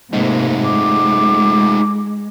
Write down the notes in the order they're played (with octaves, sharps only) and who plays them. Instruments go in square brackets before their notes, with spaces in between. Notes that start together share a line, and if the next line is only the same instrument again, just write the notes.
[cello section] G#2 C3 A#3 [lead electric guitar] A3 D#4
[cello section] G#3 [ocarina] D6